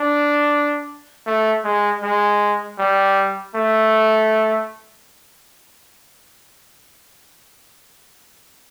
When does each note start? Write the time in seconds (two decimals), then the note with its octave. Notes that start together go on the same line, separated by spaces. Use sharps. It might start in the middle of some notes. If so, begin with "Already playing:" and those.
Already playing: D4
1.26 A3
1.64 G#3
2.03 G#3
2.78 G3
3.55 A3